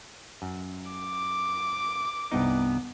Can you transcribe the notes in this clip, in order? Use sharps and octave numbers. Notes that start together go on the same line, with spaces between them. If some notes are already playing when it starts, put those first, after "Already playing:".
F#2
D6
C2 G2 B3 D#4